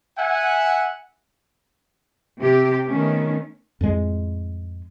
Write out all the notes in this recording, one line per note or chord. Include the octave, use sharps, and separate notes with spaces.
E5 F#5 G#5
C3 G4
D#3 A3 B3 C#4
F2 A2 G#3